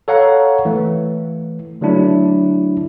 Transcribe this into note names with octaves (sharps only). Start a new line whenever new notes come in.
A4 C#5 F5 F#5 A#5
E3 A3
D3 F#3 A3 D4 E4